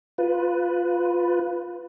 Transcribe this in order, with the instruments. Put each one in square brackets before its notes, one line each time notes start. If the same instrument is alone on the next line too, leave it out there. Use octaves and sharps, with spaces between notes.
[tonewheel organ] F4 B4